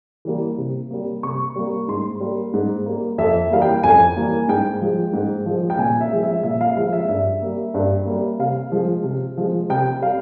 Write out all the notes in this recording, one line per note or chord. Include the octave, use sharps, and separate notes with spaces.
E3 G3 A#3
C3
G3 A#3
C3 C#6
G3 A#3
G#2 C6
G3 A#3
G#2
G3 A#3
F2 E5
E3 G3 A#3 F5
G5
F2 G#5
E3 G3 A#3
G#2 G5
F3 G#3
G#2
F3 G#3
G5
A#2 G#5
E5
F3 G#3
E5
A#2 E5
F5
F3 G#3 F5
E5
G2 E5
G3 A#3
G2
G3 A#3
C3 F5
F3 G#3
C3
F3 G#3
C3 G5
G3 F5